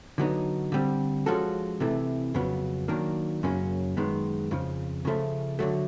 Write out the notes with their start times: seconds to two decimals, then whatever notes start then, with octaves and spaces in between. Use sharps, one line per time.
0.18 D3 F#3 B3 D#4
0.72 D3 G3 C4
1.26 F3 G#3 C#4 F#4 A4
1.80 C3 E3 A3
2.34 F2 C#3 F#3 B3
2.88 D#3 F#3 A#3 D4
3.43 F#2 C#3 F#3 A#3 C#4
3.97 F#2 D#3 G#3 B3
4.51 F2 C#3 F3
5.05 C#3 F3 A3
5.59 D3 F#3 A3